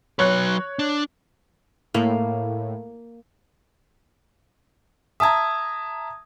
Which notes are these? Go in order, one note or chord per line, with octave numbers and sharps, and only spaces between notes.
F#3 B4 C#5 F#6
D4
A2 A#3
E5 A5 A#5 D#6 G#6